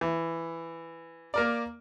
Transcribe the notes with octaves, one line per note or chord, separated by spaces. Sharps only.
E3
A#3 A#4 D5